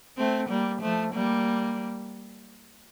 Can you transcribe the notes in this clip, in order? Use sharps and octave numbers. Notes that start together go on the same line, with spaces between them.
A3 C4
G3 A#3
F3 A3
G3 A#3